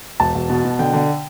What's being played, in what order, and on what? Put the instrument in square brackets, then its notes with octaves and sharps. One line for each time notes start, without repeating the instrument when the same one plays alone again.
[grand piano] E1 A5
E1
B2
B2
D3 G5
D3